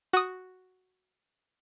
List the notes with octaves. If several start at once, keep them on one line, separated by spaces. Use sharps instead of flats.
F#4 D#6